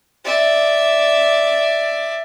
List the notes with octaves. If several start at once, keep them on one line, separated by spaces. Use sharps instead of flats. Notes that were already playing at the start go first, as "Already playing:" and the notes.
D5 E5